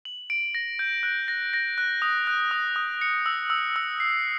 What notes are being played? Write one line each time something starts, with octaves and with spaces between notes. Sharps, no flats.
F#7
D7
A#6
G6
F#6
A#6
A#6
F#6
D#6
F#6
D#6
D#6
C#7
E6
E6
E6
C7